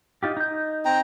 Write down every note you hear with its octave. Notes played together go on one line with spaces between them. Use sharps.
D#4 F4 G4
D#4 G6
C4 G5 A#5